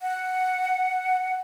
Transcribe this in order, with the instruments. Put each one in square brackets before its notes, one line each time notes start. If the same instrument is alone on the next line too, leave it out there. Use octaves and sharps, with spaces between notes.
[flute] F#5